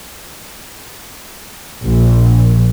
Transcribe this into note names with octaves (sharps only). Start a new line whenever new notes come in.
A#1